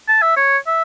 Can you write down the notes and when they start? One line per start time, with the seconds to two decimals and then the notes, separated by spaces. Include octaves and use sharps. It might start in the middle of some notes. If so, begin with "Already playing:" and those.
0.08 A5
0.22 E5
0.37 C#5
0.67 E5